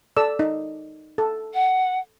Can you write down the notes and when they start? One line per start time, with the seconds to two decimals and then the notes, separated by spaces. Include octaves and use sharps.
0.17 A4 D5 E6
0.39 D#4
1.18 A4
1.53 F#5